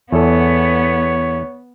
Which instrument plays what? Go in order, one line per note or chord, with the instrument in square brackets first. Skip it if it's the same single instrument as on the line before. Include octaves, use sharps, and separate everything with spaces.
[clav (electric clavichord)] E2 A4 [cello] B3 [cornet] C#5